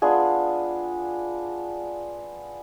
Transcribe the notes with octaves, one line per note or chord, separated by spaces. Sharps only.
B3 D4 F4 G#4